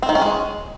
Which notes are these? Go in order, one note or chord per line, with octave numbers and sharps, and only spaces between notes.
C4
D#3
C#4
G#3